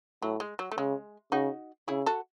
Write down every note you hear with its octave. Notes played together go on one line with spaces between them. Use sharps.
A2 F#3
G#3
F#3
A3
C#3 G#3
C#3 D#4 F#4
C#3 E4 G#4
F#4 A4